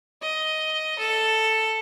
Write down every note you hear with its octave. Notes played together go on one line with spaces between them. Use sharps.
D#5
A4